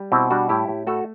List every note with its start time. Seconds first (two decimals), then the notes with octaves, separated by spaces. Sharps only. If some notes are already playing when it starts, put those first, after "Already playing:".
Already playing: G3
0.12 B2 C4 E4
0.31 G3 D4 F#4
0.49 A2 E4 G4
0.68 A2
0.87 A3 F#4 A4